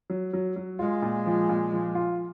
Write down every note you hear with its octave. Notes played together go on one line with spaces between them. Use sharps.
F#3
F#3
F#3
G#3 F4
A#2
F3
A#2
F3
F4